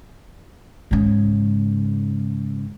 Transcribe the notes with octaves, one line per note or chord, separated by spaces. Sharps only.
G#2 C#3